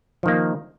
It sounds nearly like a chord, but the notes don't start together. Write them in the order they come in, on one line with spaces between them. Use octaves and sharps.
F3 D#3 A#3